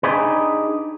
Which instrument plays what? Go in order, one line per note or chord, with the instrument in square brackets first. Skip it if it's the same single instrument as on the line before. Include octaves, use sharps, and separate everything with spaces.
[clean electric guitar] D4 D#4 G4 G#4 B4